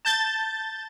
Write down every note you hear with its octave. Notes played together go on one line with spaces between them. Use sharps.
A5 G6 A6